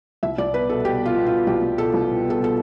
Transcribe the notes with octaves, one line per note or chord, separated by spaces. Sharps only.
C2 E5
C2 D5
B3 B4
B2 A4
B2 G4
B3 F4
B2
F4
B2
C2 G4
C2
B2 A4
C2
B2
B3
A4
B2 A4